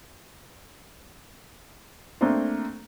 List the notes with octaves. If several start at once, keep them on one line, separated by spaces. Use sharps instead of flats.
A3 A#3 C4 D4 C5